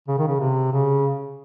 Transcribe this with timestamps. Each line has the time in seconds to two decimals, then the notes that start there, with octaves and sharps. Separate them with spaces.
0.08 C#3
0.18 D#3
0.27 C#3
0.40 C3
0.72 C#3